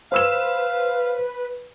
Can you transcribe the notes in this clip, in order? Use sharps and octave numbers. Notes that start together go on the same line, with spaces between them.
B4 C5 F5 E6 E7